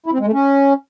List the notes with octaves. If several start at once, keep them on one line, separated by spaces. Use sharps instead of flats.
E4
C4
G#3
A3
C#4